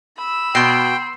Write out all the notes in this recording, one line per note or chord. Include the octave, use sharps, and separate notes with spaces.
B5 E6
B2 G5 C6 C7